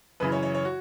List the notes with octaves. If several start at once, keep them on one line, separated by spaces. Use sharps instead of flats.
F#2 C#3 E3 B4
C#5
C#5
C#5
F#4